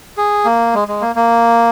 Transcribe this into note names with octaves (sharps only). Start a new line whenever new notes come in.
G#4
A#3
G#3
G#3
A#3
A#3